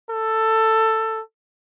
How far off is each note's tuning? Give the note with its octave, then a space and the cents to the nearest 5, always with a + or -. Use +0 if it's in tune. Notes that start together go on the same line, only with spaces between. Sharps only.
A4 +10